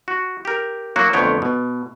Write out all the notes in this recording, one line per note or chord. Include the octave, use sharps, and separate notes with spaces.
F#4
G4 A#4
F#3 A#3 F#4
F2 D3 A3 B3 C#5 G5
B2